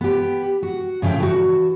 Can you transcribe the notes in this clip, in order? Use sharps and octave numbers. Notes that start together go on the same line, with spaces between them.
B3 G4
F#4
A2 C#3 F3 E5 G5
E3 F#4